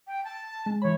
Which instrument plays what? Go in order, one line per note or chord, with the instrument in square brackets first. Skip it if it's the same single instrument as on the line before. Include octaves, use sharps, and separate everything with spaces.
[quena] G5
A5
[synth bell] G#3
[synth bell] E3 B5 [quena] C#5